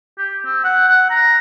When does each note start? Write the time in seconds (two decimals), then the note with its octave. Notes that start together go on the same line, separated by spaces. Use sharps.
0.18 G4
0.45 C4
0.64 F#5
0.88 F#5
1.10 A#5